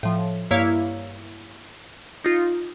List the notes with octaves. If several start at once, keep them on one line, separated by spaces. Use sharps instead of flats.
A2 F3
G2 A#3 E4 C#5 F5
D#4 F4